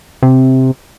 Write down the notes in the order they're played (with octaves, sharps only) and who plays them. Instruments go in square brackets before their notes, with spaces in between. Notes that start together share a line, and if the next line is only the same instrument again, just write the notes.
[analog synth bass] C3